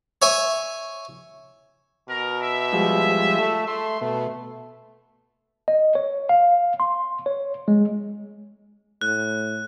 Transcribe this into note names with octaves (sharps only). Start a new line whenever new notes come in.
C#5 E5 G#5 C#6
B2 A#4
E5
F3 G3 G#3
A3
A3 C6
B2 A3
D#5
C#5
F5
C6
C#5
G#3
A2 F#6